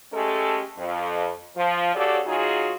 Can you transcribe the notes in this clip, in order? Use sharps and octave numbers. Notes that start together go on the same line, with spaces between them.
G#3 A3 C#4 G4 A4
F2
F3
C#3 F#4 G4 A4 C#5 D5
F#3 D#4 F4 F#4 G#4